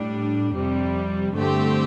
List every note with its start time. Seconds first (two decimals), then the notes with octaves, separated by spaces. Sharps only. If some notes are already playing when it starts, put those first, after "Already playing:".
Already playing: A2 G3 D4
0.54 F2 C3 G3
1.34 G2 D3 A3 C4 G4